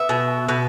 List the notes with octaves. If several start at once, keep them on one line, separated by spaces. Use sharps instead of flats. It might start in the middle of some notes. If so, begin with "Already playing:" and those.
Already playing: B3 E5
B2
B2